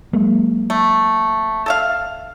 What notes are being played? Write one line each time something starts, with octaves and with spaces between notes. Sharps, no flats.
F#3 G#3 A#3
A3
A4 E5 F5